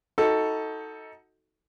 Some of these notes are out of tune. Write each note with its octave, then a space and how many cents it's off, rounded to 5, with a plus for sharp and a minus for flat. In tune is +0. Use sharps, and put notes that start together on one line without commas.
D#4 +25 F#4 +0 A4 +5